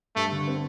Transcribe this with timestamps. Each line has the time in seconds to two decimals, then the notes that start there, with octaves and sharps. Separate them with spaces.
0.16 G2 A3
0.31 D3
0.47 C4